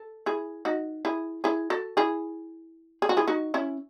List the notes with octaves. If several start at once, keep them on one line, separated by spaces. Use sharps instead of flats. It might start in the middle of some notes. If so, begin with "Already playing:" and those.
Already playing: A4
E4 G#4
D#4 F#4
E4 G#4
E4 G#4
F#4 A4
E4 G#4
G#4
F#4
E4 G#4
D#4 F#4
C#4 E4